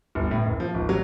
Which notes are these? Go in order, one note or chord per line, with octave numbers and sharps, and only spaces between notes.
G1
A2
F#1
F3
G#1
F#3